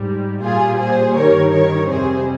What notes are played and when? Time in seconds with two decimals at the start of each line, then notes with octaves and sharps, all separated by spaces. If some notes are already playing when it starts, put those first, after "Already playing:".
Already playing: G#2 G3
0.43 A#2 G3 F4 G#4
0.79 G#4 C5
1.15 G2 D#3 G3 A#4 C#5
1.52 A#4 C#5
1.88 F2 C3 G3 G#4 C5